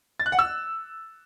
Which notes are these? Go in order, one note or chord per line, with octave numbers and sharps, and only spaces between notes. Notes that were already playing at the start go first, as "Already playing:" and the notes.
A6
F#6
F#5
E6